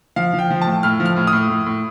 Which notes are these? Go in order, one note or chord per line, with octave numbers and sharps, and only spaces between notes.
F3 F5
F3
G5
F3
A2 A5
A2 F6
F3
F6
A2
D#6
A2
A2
A2